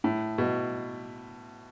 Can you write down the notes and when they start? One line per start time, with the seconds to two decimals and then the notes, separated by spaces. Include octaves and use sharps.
0.04 A2
0.38 B2